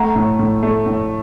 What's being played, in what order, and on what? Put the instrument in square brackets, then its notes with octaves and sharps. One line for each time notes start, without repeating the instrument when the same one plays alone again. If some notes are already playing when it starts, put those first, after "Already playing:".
Already playing: [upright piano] A3 [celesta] F#5 A#5
[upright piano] A2
A2
A3
A2